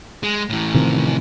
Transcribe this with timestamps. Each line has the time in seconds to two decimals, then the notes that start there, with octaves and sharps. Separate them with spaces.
0.23 G#3
0.50 A2 E3
0.75 C3 D#3 F3